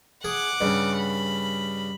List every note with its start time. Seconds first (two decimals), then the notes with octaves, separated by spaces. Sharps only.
0.24 G#4 F#5 D6
0.61 G2 C#3
0.97 B5